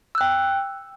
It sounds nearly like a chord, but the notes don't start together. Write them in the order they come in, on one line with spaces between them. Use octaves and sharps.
E6 F#6 G5